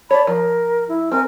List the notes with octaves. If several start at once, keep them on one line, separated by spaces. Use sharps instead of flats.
C#5 D5 A5 B5
F3 A#4
E4
C4 A#4 G#5 F6